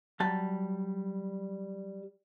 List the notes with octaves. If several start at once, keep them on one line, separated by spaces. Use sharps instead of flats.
F#3 G3 A5